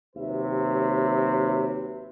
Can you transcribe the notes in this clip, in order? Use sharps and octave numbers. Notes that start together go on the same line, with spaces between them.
D#2 C3 F#3 B4 E5